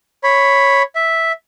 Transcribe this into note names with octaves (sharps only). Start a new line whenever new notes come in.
C#5 B5
E5